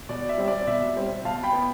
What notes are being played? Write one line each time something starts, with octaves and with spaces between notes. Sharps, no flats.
B2 D5
E5
G3 C4
D5
B2 E5
G3 C4
B2 F5 A5
G5 B5
B3